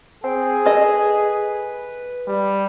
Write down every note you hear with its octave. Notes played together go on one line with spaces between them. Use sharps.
C4 G#4
A4 B4 D#5
G3